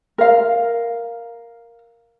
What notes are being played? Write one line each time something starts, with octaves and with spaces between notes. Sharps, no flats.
A#4 F5